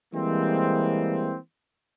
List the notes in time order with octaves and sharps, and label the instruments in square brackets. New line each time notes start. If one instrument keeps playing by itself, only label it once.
[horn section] E3 G3 G#3 A#3 C4